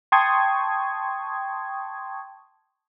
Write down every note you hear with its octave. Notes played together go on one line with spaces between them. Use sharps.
G5 A5 C6 C#6 D#6 G#6